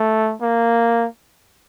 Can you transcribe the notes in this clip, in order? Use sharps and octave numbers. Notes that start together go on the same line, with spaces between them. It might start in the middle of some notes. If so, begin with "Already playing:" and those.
Already playing: A3
A#3